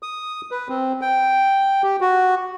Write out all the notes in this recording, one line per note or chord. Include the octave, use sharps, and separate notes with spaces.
D#6
B4
C4
G5
G4
F#4